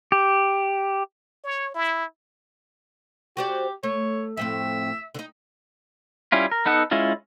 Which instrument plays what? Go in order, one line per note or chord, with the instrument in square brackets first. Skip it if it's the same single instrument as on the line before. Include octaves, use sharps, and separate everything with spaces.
[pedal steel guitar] G4
[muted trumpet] C#5
E4
[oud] F#4 C5 D5 [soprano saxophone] G4
[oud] A3 [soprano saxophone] C#5
[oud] F2 A2 C4 [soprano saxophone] E5
[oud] D3 D#4
[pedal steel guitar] G3 C#4 E4 F4
A#4
B3 D#4 A4 F#5
G#3 C#4 E4 F4